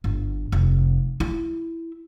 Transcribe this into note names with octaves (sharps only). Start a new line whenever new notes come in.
G1
F1
E4